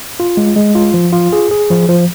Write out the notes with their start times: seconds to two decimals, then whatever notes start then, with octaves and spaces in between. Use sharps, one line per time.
0.20 F4
0.37 G#3
0.56 G#3
0.75 F4
0.94 F3
1.13 F4
1.33 G#4
1.51 G#4
1.70 F3
1.89 F3